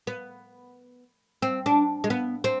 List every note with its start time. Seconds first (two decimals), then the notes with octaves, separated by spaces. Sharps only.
0.07 B3
1.42 C4
1.66 D4
2.04 G#3
2.10 B3
2.44 C4